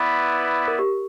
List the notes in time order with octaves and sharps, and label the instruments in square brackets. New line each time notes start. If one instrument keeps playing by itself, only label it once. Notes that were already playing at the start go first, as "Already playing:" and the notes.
Already playing: [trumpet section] B3 E4 B4 D5
[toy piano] A#4
G4